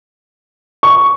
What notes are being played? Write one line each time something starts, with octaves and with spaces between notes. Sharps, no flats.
C#6